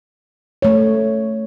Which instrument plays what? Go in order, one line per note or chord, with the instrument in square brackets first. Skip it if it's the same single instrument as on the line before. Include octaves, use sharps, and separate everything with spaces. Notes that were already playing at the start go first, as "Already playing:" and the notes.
[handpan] A3 C#5